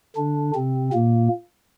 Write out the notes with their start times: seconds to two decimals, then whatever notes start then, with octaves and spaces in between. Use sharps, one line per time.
0.16 D3 D4
0.55 C3 C4
0.93 A#2 A#3